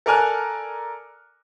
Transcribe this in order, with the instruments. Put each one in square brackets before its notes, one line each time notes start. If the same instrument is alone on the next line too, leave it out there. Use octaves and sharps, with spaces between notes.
[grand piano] A4 A#4 D5 G#5 F6 F#6